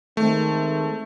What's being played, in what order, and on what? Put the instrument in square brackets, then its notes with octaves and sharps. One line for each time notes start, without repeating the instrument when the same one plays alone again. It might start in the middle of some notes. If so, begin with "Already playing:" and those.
[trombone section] D#3 G#3 C4 [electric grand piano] A3